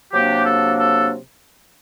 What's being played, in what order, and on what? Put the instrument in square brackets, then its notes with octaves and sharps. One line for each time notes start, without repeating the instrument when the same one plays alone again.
[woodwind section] C3 F#3 A#3 D4 G4
A4
A4